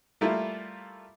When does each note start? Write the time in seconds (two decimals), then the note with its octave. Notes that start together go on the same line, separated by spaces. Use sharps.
0.21 G3 A3 A#3 E4 F4